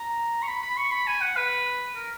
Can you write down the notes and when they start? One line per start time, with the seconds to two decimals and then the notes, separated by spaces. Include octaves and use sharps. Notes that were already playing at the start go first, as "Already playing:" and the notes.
Already playing: A#5
0.43 C#6
0.47 B5
0.63 B5
0.77 C#6
0.91 B5
1.07 G#5
1.21 F#5
1.37 B4
1.96 A#4